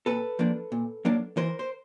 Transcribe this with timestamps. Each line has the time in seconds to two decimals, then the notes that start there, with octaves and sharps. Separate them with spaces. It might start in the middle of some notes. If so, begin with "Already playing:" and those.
0.06 A#2 A4 B4
0.39 F3 A#3 D4
0.72 A#2
1.05 F#3 A#3 D4
1.37 E3 A#4 C5
1.59 C5